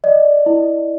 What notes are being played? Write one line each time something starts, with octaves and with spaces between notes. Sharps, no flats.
D5 D#5
E4